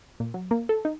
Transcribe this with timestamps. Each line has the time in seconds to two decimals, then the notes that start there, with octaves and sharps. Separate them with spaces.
0.20 A#2
0.34 F#3
0.51 A#3
0.69 A4
0.85 D#4